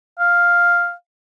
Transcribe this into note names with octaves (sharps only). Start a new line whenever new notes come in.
F5